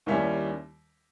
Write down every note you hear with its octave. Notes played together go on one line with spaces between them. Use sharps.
D#2 D#3 G3 C#4 E4